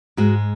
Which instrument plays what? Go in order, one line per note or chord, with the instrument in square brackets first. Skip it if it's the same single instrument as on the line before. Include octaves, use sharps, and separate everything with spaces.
[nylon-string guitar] G#2 G#3 F#4